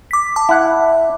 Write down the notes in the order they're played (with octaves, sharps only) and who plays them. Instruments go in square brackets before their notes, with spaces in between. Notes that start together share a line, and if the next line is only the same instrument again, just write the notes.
[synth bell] D6 B6
A5 D6
[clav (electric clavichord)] E4 F#5